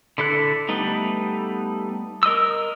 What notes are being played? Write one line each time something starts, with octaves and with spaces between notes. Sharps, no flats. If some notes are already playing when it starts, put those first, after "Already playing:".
D3 E4 A4 F#6
G3 A3 B3 D#4
A#4 D#5 D#6 E6